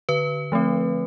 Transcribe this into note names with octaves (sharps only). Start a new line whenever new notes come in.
D3 B4
F3 A3 C4